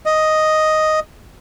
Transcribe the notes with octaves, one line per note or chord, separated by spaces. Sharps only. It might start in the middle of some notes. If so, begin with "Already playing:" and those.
D#5